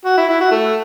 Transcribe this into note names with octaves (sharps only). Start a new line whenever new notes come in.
F#4
E4
E4
F#4
A3